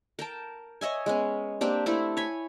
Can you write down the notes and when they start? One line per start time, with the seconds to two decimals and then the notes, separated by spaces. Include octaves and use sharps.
0.19 A#4 G5 A5
0.81 C#5 D#5 E5 G#5
1.06 G#3 B3 C#4
1.61 A#3 C4 D4 G4
1.86 A3 C4 E4 A4
2.17 C#5 G#5 B5